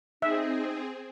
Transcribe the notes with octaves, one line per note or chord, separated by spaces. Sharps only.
C4 D#4 G#4 E5